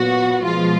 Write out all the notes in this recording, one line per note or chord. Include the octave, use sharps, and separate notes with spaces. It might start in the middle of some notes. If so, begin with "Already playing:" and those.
Already playing: A#2 F#3 B3 F#4
B2 F3 G#3 B3 F4